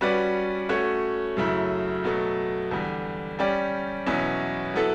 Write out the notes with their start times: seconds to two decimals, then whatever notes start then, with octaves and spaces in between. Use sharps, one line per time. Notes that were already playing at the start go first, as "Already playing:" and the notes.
0.01 G3 C#4 F#4 B4 D5
0.69 A3 C#4 F#4 C#5
1.37 F#2 C#3 F#3 A3 E4
2.04 B2 F#3 A3
2.71 E2 D3 G3
3.39 G3 C#4 G4 D5
4.06 E2 B2 F#3 C#4 E4
4.74 F#3 B3 E4 A4